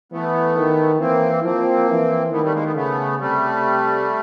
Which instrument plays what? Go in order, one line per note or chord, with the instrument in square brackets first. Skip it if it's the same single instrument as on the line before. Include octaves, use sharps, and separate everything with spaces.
[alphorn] E3 [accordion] A3 B3
[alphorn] D#3
[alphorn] E3 [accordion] A#3 C4
[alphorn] F3 [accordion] A#3 C4
[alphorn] E3
[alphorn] D#3 [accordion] A3 B3
[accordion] G3 A3
G#3 A#3
A3 B3
[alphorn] C#3 [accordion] A3 B3
[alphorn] C3 [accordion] G3 A3